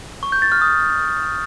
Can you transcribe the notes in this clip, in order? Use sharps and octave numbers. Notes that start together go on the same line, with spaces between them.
C#6
G6
A6
F6
D#6